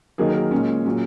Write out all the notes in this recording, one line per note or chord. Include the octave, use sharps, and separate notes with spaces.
D#3 F#3 A#3 G#4
A#4
G#4
A#2 G#3 C#4
A#2 F#3 C#4